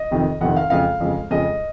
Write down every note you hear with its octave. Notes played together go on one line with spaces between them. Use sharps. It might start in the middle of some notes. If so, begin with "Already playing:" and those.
Already playing: D#5
F2 C3 D#3
F2 C3 D#3 F#5
F5
F2 C#3 G#3 F5
F2 C#3 G#3
F2 C#3 G#3 D#5